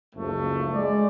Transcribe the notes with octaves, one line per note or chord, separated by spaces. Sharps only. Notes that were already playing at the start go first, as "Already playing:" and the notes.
F#1 C#2 F3 A3
G#3 D5